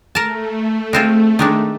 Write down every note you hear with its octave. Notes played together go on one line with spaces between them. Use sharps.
A3 A#4 A5
G#3 C4 F4
D#3 G#3 D4